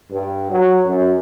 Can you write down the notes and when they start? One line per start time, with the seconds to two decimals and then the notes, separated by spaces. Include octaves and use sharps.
0.11 G2
0.51 F#3
0.85 F#2